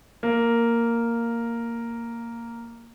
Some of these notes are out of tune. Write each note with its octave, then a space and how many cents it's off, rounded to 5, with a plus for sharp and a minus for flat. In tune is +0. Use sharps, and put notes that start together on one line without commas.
A#3 -5